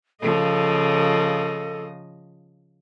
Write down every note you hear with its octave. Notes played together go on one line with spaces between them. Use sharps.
C#3 F3 A4 D#5